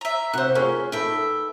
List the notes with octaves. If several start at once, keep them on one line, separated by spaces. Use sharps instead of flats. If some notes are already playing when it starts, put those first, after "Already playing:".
E5 A#5
C3 B3 F#4 C5 F#6
C#4 F4 G#4 A#4
D#4 A4 B4 E5 G5